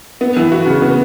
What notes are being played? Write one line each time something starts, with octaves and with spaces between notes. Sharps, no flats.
B3
E3
F#4
C#3
B3